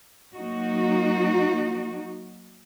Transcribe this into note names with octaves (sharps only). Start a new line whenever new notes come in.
F#3 A#3 D#4 F#4